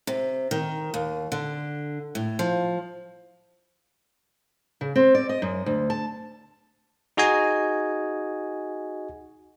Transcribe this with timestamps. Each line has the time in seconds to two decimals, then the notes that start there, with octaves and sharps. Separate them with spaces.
0.07 C3
0.51 D#3
0.94 D#2
1.32 D3
2.15 A2
2.39 F3
4.81 C#3
4.96 C4
5.15 D5
5.29 D#5
5.42 F#2
5.66 D2
5.90 A5
7.17 D#4 F#4 G#4 D#5 G#5